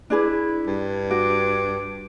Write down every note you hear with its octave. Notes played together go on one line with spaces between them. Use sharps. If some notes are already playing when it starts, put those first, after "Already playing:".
D4 E4 G#4 B4
G2
F#4 D6